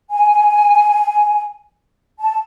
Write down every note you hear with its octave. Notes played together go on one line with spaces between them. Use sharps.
G#5
A5